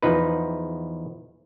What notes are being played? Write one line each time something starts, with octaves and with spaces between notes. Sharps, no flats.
E2 F3 D#4 B4